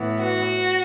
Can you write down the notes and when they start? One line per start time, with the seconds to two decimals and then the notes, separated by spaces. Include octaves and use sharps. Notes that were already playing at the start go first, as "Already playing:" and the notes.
Already playing: A2 E3 B3
0.22 F#4